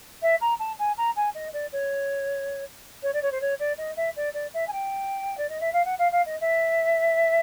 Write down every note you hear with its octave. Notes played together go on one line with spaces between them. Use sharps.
E5
A#5
A5
G#5
A#5
G#5
D#5
D5
C#5
C#5
D5
C#5
C5
C#5
D5
D#5
E5
D5
D5
E5
G#5
G5
D5
D#5
E5
F5
F#5
F5
F5
D#5
E5